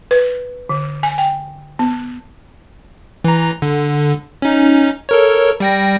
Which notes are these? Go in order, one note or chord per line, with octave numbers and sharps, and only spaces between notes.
B4
D3
G#5
G5
B3
E3 A#5
D3
C#4 D#4
A4 A#4 C#5
G3 G5 A#6